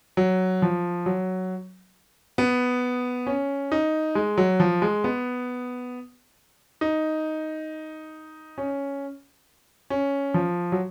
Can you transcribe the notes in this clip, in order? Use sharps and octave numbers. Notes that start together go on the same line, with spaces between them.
F#3
F3
F#3
B3
C#4
D#4
G#3
F#3
F3
G#3
B3
D#4
C#4
C#4
F3
F#3